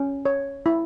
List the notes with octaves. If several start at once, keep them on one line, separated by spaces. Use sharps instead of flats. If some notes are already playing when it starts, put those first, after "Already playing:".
Already playing: C#4
C#5
E4